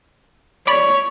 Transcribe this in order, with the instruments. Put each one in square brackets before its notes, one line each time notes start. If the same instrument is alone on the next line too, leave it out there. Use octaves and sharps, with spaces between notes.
[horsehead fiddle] C#5 [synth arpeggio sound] D5 B5